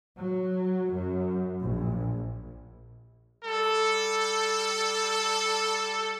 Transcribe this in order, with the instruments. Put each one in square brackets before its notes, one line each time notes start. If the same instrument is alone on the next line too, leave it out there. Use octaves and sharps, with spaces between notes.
[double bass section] F#3
F#2
A#1
[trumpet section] G3 A4